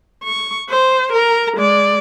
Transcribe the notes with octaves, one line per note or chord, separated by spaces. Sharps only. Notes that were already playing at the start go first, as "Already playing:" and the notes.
C#6
C5
A#4 A#5
G#3 D5